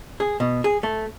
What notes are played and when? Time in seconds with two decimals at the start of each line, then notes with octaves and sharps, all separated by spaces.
0.20 G#4
0.40 B2
0.64 G#4
0.83 A3